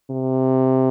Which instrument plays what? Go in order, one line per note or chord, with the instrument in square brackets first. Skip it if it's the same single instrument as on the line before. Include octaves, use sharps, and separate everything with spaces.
[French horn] C3